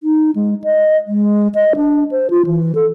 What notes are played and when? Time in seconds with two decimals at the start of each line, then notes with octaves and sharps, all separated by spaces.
0.03 D#4
0.35 G#3
0.64 D#5
1.07 G#3
1.55 D#5
1.76 D4
2.11 C5
2.30 F4
2.46 E3
2.75 A4